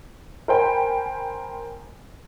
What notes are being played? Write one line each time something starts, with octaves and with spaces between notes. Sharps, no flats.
A#4 C5 G5 G#5 B5